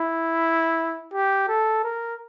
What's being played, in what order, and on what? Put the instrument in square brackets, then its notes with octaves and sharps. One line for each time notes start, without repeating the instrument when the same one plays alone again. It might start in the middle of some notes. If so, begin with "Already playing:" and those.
Already playing: [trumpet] E4
G4
A4
A#4